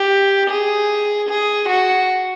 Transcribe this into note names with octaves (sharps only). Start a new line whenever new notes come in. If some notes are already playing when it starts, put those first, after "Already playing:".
Already playing: G4
G#4
G#4
F#4